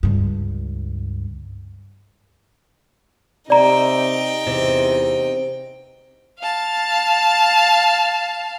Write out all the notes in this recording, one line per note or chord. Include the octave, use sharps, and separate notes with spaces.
C#2 G2
C3 D#4 D5 G5 A#5
E2 C3
F5 A5